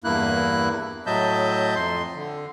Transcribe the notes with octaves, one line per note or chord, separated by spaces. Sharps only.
E2 G2 A#3 E4 F#6
A2 F#3 D#5 E5 A5 G6
F2 C6
D3